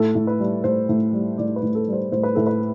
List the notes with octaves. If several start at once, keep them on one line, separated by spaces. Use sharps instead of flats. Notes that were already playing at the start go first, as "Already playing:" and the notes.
Already playing: A2 A4
A2
B4
G3
A2 C5
A2
G3
A2 D5
B4
A2
A4
G3 C5
A2 C5
B4
A2 A4
B4